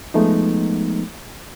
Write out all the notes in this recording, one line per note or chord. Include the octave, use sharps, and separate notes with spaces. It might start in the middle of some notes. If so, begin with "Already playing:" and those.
F3 G#3 A3 B3 D#4